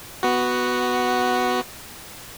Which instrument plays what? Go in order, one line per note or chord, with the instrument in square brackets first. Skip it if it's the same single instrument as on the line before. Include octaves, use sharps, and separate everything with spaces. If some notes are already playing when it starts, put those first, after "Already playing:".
[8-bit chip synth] B3 F#4